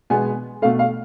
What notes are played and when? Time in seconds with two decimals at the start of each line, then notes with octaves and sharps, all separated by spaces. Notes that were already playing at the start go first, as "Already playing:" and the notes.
0.10 B2 G#3 B3 G#5
0.62 B2 A3 F5
0.79 F5